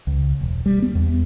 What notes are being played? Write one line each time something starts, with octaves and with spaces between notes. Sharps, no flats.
C#2
E1
G3
B3
E2